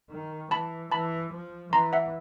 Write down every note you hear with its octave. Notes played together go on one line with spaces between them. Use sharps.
D#3
E3 A5 B5
E3 A5 B5
F3
E3 A#5 C6
E5 F#5